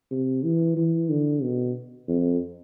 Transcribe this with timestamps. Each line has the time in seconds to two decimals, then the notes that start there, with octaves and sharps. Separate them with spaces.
0.11 C3
0.43 E3
0.77 E3
1.10 D3
1.42 B2
2.08 F2